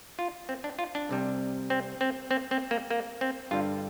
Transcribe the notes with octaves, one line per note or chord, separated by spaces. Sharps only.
F4
C4
D4
F4
D4
C2 C3 G3
C4
C4
C4
C4
A#3
A#3
C4
G2 D3 G3 F4